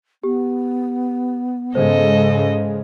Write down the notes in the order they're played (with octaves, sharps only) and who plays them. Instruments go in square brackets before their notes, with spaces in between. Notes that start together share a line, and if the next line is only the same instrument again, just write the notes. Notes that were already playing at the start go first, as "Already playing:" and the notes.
[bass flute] B3 [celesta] G4
[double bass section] G#2 C#3 G#3 [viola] A4 D#5 [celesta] C5